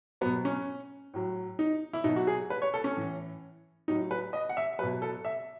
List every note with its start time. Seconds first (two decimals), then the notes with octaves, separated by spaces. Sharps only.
0.21 F#3 B3
0.26 B2
0.45 C#4
1.14 A2 F#3
1.59 D#4
1.93 E4
2.04 B2 F#3 D#4
2.16 F#4
2.27 G#4
2.50 B4
2.62 C#5
2.74 A4
2.84 C#4
2.96 A2 E3
3.88 A2 F#3 D#4
4.11 B4
4.33 D#5
4.49 F#5
4.57 E5
4.79 B2 F#3 B4
5.02 A4
5.25 E5